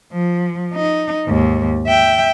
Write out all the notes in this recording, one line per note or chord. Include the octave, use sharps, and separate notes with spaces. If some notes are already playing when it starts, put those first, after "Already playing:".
F3
D#4
D#2 G#2
E5 G5